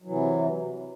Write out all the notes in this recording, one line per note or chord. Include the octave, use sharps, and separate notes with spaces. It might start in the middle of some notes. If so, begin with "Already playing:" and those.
C3 E3 F#3